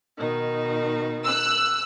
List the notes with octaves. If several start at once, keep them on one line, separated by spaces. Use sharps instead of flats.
B2 D#3 D#4
E6 F#6